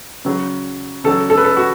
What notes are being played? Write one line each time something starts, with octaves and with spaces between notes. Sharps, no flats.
C#3 F#3
C#3 F#3 A4
A4
B4
A4
F#4